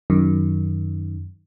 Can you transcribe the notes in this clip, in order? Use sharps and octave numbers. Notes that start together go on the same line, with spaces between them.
F#2 D#3